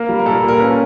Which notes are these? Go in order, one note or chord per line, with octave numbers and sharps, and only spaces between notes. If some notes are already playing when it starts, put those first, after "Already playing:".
Already playing: A#3 A#4
G3
A#4
A#2 A4
A#2
A#4
C#4 B4